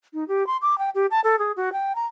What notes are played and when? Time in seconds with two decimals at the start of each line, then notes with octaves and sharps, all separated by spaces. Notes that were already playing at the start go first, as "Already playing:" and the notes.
0.14 D#4
0.28 G4
0.47 C6
0.62 D6
0.78 G5
0.95 G4
1.11 A5
1.24 A4
1.39 G#4
1.57 F#4
1.73 G5
1.95 A#5